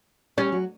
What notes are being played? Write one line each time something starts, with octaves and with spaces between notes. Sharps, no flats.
G3 C#4 G4
F#3 F#4